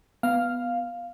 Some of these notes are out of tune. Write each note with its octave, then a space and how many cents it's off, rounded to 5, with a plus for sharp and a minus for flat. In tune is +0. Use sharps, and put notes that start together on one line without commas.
B3 +0 F5 +0